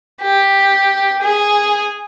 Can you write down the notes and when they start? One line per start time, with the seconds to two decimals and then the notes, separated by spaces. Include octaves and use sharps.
0.22 G4
1.22 G#4